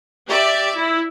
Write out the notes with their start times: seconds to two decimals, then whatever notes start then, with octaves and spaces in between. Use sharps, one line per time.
0.27 G4 D5 E5
0.75 E4